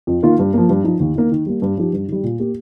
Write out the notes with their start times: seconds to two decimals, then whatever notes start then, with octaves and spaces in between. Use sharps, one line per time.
0.07 F2
0.23 D#3 A#3 F4
0.39 G2
0.54 F3 A#3
0.69 G2
0.84 F3 D#4
1.00 D#2
1.15 D#3 A#3
1.32 D#3
1.46 G3 A#3
1.62 G2
1.77 F3 D#4 G4
1.93 G2
2.08 D#3 G3
2.24 A#2
2.39 A#3 G4